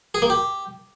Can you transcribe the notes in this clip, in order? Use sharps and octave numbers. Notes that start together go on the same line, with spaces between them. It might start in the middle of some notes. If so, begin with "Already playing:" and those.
G#4
A#3
G4